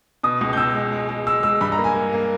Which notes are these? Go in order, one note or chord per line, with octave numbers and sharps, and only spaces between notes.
B2 D#6
C#2
G6
B2 E6
G#3
G#3
G#3
G#3 E6
G#3 E6
G2 B5
A#5
A#3
G#5
A#3
A#3